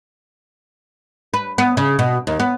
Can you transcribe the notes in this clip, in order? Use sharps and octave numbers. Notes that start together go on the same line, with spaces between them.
B4
B3
C#3
B2
D#2
B3